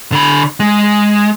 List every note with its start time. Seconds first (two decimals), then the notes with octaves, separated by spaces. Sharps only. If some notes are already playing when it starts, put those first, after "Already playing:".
0.12 D3 B5
0.60 G#3